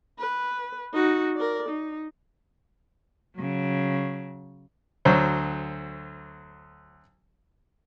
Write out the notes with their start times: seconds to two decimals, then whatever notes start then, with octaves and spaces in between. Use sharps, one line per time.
0.19 B4
0.93 D#4 F#4
1.37 A#4 D5
1.69 D#4
3.37 C#3 F#3
5.05 D2 F#3 C5